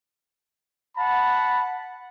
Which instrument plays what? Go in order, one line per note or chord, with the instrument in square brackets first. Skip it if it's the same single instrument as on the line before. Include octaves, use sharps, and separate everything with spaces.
[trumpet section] F#5 A5 B5